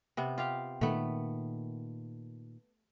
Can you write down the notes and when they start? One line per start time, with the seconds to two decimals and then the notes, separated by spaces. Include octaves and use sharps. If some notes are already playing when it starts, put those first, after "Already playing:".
0.17 C3 B3
0.38 F4 G4 F5
0.81 A#2 D#3 A3 B3